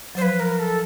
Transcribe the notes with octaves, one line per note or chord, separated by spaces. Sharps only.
F#3 C5
F3 B4
A#4
A4